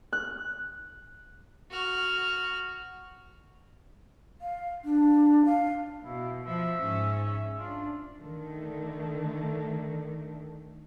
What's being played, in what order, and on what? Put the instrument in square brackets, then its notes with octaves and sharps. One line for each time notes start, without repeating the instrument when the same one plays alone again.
[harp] F#6
[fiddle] F#4 F6
[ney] F5
D4
F5
[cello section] B2 [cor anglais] E4
[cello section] F3 [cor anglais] E5
[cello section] G#2 C#4
[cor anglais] E5
[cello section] D4 [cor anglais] F4
[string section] D3 D#3 A3